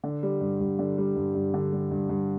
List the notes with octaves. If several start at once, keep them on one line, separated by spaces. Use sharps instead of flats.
D3
G3
G2
G2
D3
G3
G2
G2
D3
G3
G2
G2